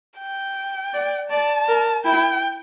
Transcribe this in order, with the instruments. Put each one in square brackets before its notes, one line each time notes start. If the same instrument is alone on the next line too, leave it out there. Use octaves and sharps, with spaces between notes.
[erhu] G5
[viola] D5
[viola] D5 [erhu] A5
[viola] A#4
[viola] E4 [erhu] G5